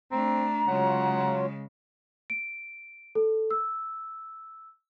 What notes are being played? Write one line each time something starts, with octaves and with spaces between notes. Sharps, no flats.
A3 C4 D4 A#5
C#3 F#3 G#3 F4 C#5 F#5
D7
A4
E6